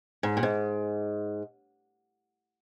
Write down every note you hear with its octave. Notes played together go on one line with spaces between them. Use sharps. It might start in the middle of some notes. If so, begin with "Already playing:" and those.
G#2
A#2
G#2